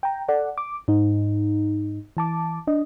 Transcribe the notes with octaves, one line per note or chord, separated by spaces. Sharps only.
G5 A#5
A4 D5 F#5
D6
G#2 D#4
E3 A5 D6
D4 D#5